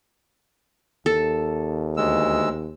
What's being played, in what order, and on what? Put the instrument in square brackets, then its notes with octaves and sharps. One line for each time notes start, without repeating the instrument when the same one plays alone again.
[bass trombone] D#2 [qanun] A4
[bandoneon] D2 G#3 E6